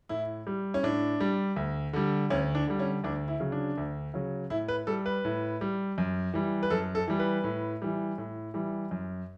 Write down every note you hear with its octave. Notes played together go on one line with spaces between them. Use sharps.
A2 E4
G3
C#4
A2 D4
G3
D2
D3 G3
D2 C#4
D4
D3 G3
C#4
D2 D4
E4
C#3 F#3
D4
D2
C#3 F#3
A2 E4
B4
G3 A4
B4
A2
G3
F#2
E3 G3
B4
F#2 A4
A4
E3 G3
B4
A2
E3 G3
A2
E3 G3
F#2